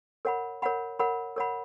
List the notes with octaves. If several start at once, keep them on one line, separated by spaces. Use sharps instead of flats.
A#4 C#5 F#5 B5
A#4 C#5 F#5 B5
A#4 C#5 F#5 B5
A#4 C#5 F#5 B5